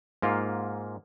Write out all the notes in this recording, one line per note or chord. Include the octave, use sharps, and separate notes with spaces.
G#2 A#3 F4